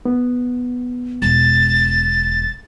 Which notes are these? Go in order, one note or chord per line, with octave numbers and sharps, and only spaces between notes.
B3
E1 A6